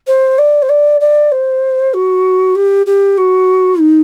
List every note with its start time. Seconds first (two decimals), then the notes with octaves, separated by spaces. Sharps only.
0.07 C5
0.38 D5
0.62 C5
0.69 D5
1.00 D5
1.31 C5
1.93 F#4
2.55 G4
2.86 G4
3.17 F#4
3.79 D#4